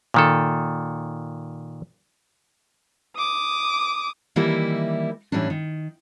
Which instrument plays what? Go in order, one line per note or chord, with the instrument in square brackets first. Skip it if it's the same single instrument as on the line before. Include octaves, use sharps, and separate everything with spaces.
[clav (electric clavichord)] A#2 D#3 A4
[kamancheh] D6 D#6
[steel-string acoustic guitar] D#3 E3 G3 A#3 E4 G4
A2 E3 G3 C#4 D4
D#3